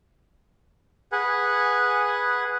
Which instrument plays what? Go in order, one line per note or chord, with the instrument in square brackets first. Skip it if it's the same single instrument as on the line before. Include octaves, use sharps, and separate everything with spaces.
[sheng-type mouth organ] G#4 B4 F#5 G#5